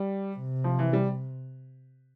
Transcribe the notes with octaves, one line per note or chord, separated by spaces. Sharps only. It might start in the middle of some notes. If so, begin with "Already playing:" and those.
Already playing: G3
C3
F3
E3
G3